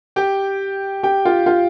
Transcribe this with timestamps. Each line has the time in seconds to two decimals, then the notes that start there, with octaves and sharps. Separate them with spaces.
0.16 G4 G5
1.03 G4 G5
1.25 F4
1.46 F4